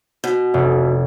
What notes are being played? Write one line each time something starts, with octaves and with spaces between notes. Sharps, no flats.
B2
F1